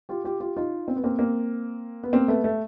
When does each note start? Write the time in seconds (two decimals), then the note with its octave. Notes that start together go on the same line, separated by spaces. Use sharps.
0.09 F4 G4
0.24 F4 G4
0.40 F4 G4
0.57 D#4 F4
0.88 C4
0.96 B3
1.04 A#3 C4
1.19 A#3 C4
2.03 B3
2.13 A#3 C4
2.28 A3 B3
2.44 A3